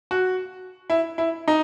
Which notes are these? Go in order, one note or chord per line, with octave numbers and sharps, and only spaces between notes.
F#4
E4
E4
D#4